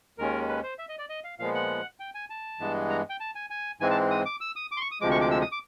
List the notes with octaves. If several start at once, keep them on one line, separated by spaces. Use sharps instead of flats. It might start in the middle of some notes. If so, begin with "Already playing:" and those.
D#2 D#3 G#3 C#4 A#4
B4
C5
E5
D#5
D5
D#5
F5
A#2 F3 G#3 B3 F5
F#5
G5
G#5
A5
G2 E3 G#3 B3
A#5
G5
A5
G#5
G#5
G#2 E3 G#3 C4 G#5
A5
D#6
D6
E6
D#6
D6
C6
C#6
D#6
D2 C3 F3 G#3 D6
C#6
D6
E6
D#6
D6